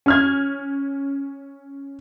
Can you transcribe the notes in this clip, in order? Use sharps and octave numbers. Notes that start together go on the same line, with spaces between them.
C#4 F6 G#6